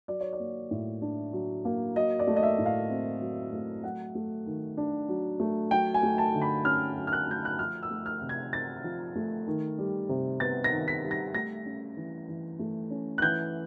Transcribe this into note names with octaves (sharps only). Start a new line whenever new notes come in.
F#3 D5
C#5
D5
A#3
A2
D4
F#3
A#3
F#3 D#5
D5
A3
D#5
E5
A2
F5
C4
F#3
A3
F#3 F#5
A3
D#3
D4
F#3
A3
F#3 G5
G#5
A3
A5
D3
B5
C#4 F6
F#3
F6
F#6
A3 G6
F#6
F3 F6
E6
A3
F6
C3
G#6
C4 A6
F3
A3
D#3
G3
C3
B3 A6
A#6
D#3
B6
G3
A#6
A3 A#6
C#4
E3
E3
A3
C#4
F#6
E3 G6